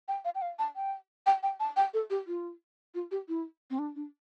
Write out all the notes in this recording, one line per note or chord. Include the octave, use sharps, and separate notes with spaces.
G5
F5
G5
F5
A5
G5
G5
G5
A5
G5
A4
G4
F4
F4
G4
E4
C4
D4
D4